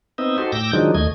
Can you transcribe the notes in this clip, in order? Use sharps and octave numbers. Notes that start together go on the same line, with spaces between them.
B3 C4 D#4 D#5 E5
D#4 F#4 G4 A4 C5
A2 G5 D6 E6 G6 A#6
D#3 F3 F#3 G#3 D4 D#4
D#2 A3 D#5 G#6